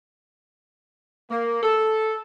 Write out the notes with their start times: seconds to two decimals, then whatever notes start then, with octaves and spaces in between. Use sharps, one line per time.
1.30 A#3
1.63 A4